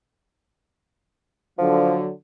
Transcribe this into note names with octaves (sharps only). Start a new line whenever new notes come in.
D3 F3 F#3